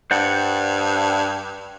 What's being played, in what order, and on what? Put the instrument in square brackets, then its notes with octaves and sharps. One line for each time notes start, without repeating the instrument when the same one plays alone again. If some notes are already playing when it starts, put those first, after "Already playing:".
[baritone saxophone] G2 [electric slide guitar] C5 D5 F#5